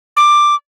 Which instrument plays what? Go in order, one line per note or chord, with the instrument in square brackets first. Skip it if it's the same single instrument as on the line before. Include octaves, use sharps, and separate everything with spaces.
[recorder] D6